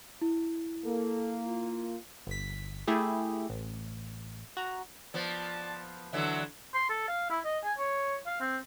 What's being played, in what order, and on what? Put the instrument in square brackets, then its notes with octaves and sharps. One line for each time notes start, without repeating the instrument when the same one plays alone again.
[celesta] E4
[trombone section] A#3 [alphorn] A4
[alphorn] F4
[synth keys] G1 B6
A3 E4 G4 G#4
A1
F#4 A#5
[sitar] F3 B3 [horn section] D5 A5
[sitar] D3 E3 F#3 [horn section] E5 F#5
[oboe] C6
A4
F5
E4
D#5
G#5
C#5
F5
C4